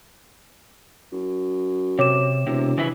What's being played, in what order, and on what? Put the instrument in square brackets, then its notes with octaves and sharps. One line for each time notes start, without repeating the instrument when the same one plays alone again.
[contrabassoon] F#2
[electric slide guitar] C3 [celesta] C#5 D6 E7
[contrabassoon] E1 [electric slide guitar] C3
[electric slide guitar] C#3 E3 E4